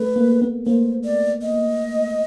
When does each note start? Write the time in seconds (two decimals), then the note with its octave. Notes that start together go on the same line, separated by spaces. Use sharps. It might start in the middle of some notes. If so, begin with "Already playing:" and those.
Already playing: A3 B4
0.16 A#3
0.42 B3
0.67 A#3 C5
1.05 D5
1.42 D#5